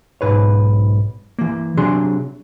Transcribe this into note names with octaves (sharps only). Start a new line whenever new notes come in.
B1 G#2 B4 C#5
E3 A#3
C3 F#3 D4 G#4 C6